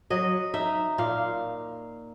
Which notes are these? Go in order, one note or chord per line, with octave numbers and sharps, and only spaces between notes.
F#3 D#5
D#4 E5
A#2 F5